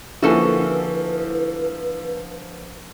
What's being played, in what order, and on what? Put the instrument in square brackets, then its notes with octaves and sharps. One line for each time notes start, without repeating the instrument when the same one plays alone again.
[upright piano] D3 F3 A#3 [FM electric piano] E4 [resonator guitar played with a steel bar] F#4 A4 G#5 [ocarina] B4